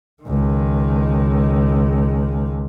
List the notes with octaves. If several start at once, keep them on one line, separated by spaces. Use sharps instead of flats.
C#2 D#3